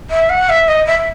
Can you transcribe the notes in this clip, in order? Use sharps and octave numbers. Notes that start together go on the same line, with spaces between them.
E5
F#5
E5
D#5
E5